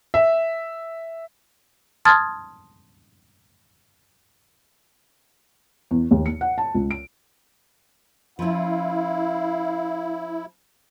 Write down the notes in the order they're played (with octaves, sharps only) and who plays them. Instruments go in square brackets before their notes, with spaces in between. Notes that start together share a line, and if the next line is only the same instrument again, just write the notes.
[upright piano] E5
[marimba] A5 C6 D#6 F6 G#6 A6
[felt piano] E2
D#2
C#7
F#5
A5
C#2
D7
[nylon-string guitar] F3 C#4 [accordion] E4 [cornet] F5